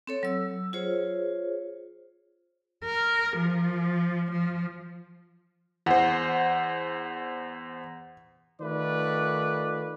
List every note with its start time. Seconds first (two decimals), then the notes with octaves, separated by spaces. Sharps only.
0.07 C4 A4 C#5
0.23 F#3 E6
0.73 F4 G#4 C5 C#5
2.85 A#4
3.37 F3
4.32 F3
5.86 E2 C5 F#5
8.61 D#3 A3 F4 B4 D5